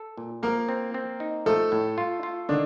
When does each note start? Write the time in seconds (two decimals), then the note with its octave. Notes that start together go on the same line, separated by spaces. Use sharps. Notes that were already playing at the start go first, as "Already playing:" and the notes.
Already playing: A4
0.18 A#2
0.43 F3 A#3 A#4
0.69 C4
0.94 C4
1.20 D#4
1.46 F3 A3 A4
1.72 A2
1.98 F4
2.23 F4
2.49 D3 D#3 D4